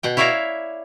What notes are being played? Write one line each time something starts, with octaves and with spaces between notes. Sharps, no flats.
B2 F#5 G5
E4 C#5 D5 E5 F5 A#5